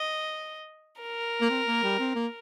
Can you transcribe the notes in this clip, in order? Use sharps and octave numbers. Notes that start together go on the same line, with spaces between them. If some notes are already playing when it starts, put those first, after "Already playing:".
Already playing: D#5
A#4
A#3
C4
A#3
G3
C4
A#3